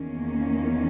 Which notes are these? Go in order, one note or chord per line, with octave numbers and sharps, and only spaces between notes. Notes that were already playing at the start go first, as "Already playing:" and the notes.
Already playing: E2 D#3 A#3 C#4